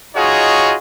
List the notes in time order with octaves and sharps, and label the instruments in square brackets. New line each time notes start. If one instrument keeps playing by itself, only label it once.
[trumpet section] D#4 F4 F#4 G#4 C#5 D#5